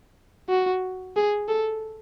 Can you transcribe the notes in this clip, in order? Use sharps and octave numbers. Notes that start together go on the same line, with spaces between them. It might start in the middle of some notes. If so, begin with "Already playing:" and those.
F#4
G#4
A4